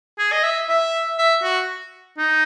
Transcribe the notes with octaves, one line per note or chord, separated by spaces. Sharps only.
G#4
D#5
E5
E5
E5
F#4
D#4